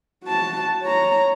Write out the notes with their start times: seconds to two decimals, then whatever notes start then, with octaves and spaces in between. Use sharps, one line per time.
0.24 F#4 A5
0.83 C#5 A#5